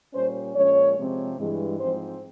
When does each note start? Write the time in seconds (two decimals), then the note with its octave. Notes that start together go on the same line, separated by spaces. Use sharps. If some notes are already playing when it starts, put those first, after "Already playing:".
0.13 A#2 G3 C#4 C5
0.54 A#2 F3 G#3 C#4 C#5
0.96 C3 F3 G#3 C4
1.37 G2 E3 G#3
1.78 G#2 F3 C4 C5